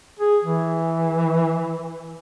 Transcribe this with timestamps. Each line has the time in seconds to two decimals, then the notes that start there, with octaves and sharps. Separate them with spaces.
0.19 G#4
0.44 E3